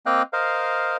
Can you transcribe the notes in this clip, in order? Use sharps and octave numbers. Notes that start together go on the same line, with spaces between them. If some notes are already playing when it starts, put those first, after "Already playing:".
A#3 C4 D#5 F5 G5 F#6
A#4 C5 D#5 F5